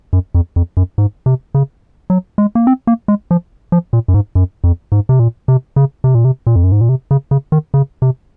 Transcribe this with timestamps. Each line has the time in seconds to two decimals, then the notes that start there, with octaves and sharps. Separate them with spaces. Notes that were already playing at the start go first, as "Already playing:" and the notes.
0.13 F#2
0.35 F2
0.56 F2
0.77 F#2
0.98 G#2
1.26 C3
1.55 C#3
2.10 F#3
2.38 G#3
2.55 A#3
2.67 C4
2.87 A#3
3.08 G#3
3.31 F3
3.72 F3
3.93 A#2
4.08 F#2
4.14 G#2
4.35 F#2
4.64 F2
4.92 G#2
5.09 C3
5.19 A#2
5.48 C3
5.76 C#3
6.04 C3
6.15 A#2
6.25 C3
6.47 A#2
6.56 F2
6.64 F#2
6.72 G#2
6.81 A#2
6.89 C3
7.11 C#3
7.31 C#3
7.52 D#3
7.74 C#3
8.02 C3